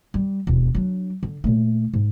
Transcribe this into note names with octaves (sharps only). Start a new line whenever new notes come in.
G3
E1 D#2
F#3 D4
D3
A#2 A3
G#2